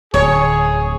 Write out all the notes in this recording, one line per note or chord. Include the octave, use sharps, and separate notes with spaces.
D1 G#4 C#5